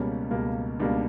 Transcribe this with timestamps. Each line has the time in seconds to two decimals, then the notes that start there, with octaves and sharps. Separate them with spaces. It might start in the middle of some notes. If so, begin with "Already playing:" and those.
Already playing: C#2 B2 G3 A#3 C#4
0.30 C#2 B2 G3 A#3
0.79 C#2 B2 G3 A#3 D4